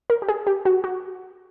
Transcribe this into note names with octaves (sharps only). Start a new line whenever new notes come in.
A#4
G4
G#4
G4
F#4
F#4